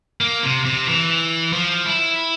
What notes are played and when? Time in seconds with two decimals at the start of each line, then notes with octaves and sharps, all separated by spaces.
0.21 A#3
0.43 C3
0.65 C3
0.87 E3
1.53 F3
1.86 E4